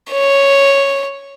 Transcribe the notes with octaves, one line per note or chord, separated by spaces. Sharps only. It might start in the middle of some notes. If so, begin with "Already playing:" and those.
C#5